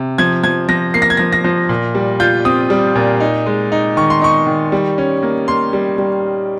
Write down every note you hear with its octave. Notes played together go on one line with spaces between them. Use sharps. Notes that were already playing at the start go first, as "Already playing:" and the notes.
Already playing: C3
F3 G#6
F3 G#6
F3 A#6
A#3 C7
A#6
G#6
F3 A#6
A#6
F3
A#2
G3
F4 G6
C4 D#6
G3
A#2
D#4
G#3
D#4
D#3 C#6
C6
D#4 C#6
D#3
G3
C#4
A#3
A#3 C6
G3
G3